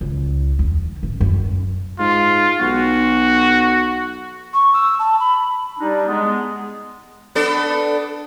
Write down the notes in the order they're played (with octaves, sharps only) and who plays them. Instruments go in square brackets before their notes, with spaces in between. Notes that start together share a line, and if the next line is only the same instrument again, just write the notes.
[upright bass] C#2
E2
A1
F#2
[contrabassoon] G#2 [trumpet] F4
[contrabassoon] B1 [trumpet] F#4
[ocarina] C#6
E6
A5
B5
[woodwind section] G3 D4 D#4
G#3 B3
[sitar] B3 D4 A4